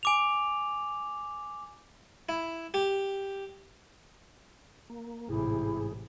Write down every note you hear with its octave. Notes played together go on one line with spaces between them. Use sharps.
G#5 D6 F7
E4
G4
A#3
A1 G#2 C3 E4 G#4